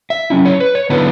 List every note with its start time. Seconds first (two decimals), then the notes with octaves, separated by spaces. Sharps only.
0.10 E5
0.30 F#3 C#4 E4
0.45 C#5
0.60 B4
0.75 C#5
0.90 D3 F#3 B3 E4 B4